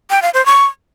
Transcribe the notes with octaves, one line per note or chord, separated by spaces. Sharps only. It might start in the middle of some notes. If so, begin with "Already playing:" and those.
G5
F5
C5
C#6